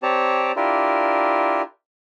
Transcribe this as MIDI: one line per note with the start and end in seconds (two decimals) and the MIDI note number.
0.03 0.52 60
0.03 0.52 67
0.03 0.52 73
0.03 0.52 74
0.03 0.52 81
0.03 0.52 82
0.56 1.62 62
0.56 1.62 64
0.56 1.62 65
0.56 1.62 67
0.56 1.62 70